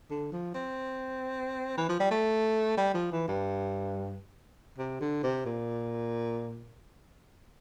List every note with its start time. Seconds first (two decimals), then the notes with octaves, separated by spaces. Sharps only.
0.10 D3
0.32 F3
0.54 C4
1.77 E3
1.89 F3
2.00 G3
2.11 A3
2.77 G3
2.94 F3
3.12 E3
3.28 G2
4.78 C3
5.01 D3
5.23 C3
5.46 A#2